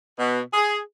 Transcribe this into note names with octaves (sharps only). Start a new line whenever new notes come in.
B2
G#4